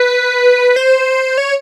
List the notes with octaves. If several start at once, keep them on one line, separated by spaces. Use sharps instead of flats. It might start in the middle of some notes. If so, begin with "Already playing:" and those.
Already playing: B4
C5
C#5